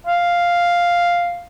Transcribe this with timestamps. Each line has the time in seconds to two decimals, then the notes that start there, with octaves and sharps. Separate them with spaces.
0.06 F5